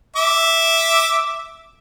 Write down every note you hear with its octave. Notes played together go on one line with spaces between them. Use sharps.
E5 D6